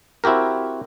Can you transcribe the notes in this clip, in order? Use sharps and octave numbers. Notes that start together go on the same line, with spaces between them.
C4 E4 F#4 G4 A#4